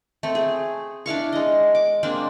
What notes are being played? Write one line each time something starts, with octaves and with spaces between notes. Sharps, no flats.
A3 C4
G#4
D4 E4 F5 C#6
G#3 D#5
D6
G#3 A#3 C4 D4